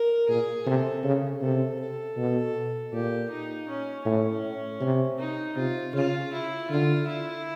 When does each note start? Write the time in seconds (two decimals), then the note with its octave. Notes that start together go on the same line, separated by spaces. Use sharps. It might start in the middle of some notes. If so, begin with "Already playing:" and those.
Already playing: A#4
0.29 A#2 G#4
0.66 C3 A4
1.04 C#3
1.41 C3 A4
1.80 A4
2.17 B2
2.93 A#2 G4
3.30 D#4
3.69 C#4
4.05 A2 C#4
4.81 C3
5.18 D#4
5.56 C3 F4
5.94 C#3 F4
6.32 E4
6.69 D3 F4
7.07 E4